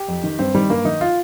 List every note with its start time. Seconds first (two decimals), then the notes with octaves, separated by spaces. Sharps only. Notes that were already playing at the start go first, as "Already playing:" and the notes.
Already playing: G4
0.08 F2
0.24 D#3
0.39 G2 C4
0.55 D#3 G3
0.69 G2 A#3
0.85 D#3 D#4
1.01 F4